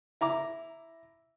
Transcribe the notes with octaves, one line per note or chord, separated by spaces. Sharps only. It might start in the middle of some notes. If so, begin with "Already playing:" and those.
E4 A#5 D6